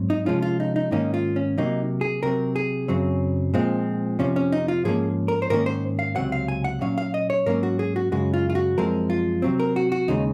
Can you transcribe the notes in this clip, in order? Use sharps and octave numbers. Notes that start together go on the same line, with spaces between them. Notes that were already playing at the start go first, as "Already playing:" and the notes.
Already playing: G#2 F#3 C4
D#4
C3 F3 G#3 C#4 F4
F4
D#4
D#4
G#2 D#3 A#3 C#4 D#4
F4
C#4
C3 F#3 A#3 D#4
G#4
C3 F#3 C4 A#4
G#4
F#2 C#3 F#3 C4
A#2 F3 G#3 C4
F2 C3 F3 C#4
C#4
D#4
F4
G#2 F3 A#3 C#4 G#4
A#4
C5
G#2 D#3 A#3 C#4 A#4
C5
F5
C#2 C3 F#3 C4 F#5
F5
G#5
F#5
A#2 F#3 C#4 F5
F5
D#5
C#5
G#2 F#3 A#3 C#4 A#4
F#4
G#4
F#4
F#2 C#3 G#3 F#4
F4
F4
F#4
F#2 F3 G#3 C4 A#4
F4
C3 F#3 C4
A#4
F#4
F#4
D#2 C#3 G#3 D#4